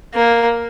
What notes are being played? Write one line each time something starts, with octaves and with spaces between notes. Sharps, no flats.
A#3